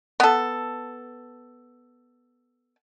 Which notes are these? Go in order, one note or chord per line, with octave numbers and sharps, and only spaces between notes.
B3 A4